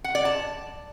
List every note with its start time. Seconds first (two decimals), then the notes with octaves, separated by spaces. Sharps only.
0.04 F#5
0.15 D5
0.25 A5